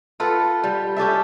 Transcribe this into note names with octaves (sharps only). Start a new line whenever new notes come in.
F4 A4 B4 F#5
G3
C#4 G4 A4 E5